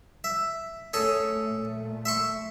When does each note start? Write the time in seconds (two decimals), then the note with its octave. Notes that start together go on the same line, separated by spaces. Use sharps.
0.24 E5
0.93 A3 C#4 G#4 A4
1.43 A#2 A3
2.05 E5 C6 C#6